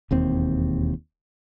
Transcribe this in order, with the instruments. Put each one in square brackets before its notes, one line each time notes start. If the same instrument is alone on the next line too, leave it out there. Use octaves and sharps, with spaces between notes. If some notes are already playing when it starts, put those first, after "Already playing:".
[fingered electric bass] E1 D#2 C4